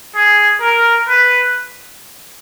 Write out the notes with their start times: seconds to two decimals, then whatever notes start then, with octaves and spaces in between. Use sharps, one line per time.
0.15 G#4
0.61 A#4
1.08 B4